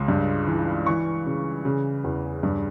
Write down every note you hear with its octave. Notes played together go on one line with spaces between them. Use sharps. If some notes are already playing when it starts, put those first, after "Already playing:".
Already playing: C#2 C#3
G2
E3
E3 C#6
C#3
C#3
E2
G2